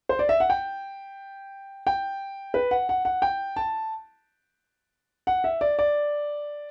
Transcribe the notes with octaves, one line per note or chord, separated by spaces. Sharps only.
C5
D5
E5
F#5
G5
G5
B4
F#5
F#5
F#5
G5
A5
F#5
E5
D5
D5